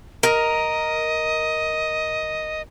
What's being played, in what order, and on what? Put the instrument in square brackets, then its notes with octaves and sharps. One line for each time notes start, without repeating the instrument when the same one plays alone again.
[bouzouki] A#4 A#5 [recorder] D#5